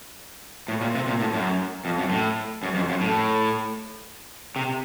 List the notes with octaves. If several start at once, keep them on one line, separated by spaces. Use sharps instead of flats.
A2
A#2
C3
A#2
A2
F#2
F2
F#2
A2
F#2
F2
F#2
A2
C3